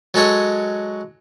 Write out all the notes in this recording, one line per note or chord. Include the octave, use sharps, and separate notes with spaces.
F#3 G#3 A4 C#5 D#5